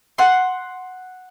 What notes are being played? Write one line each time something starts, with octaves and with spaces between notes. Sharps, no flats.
F#5 C6